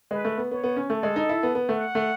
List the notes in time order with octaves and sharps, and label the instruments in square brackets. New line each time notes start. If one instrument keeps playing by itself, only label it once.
[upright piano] G#3 [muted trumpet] B4
[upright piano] A3
B3
[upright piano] B3 [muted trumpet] C#5
[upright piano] B3
C#4
[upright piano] A3 [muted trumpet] A4
[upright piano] G#3
D#4
E4
B3
B3
[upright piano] A3 [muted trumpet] F#5
[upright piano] A3